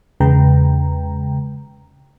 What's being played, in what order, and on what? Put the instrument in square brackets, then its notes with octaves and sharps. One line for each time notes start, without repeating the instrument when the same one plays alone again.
[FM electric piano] E2 C#3 G#3 B4 G5 A#5